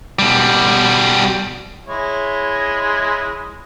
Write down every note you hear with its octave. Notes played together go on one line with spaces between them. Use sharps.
B2 G3
G#3 E4 C#5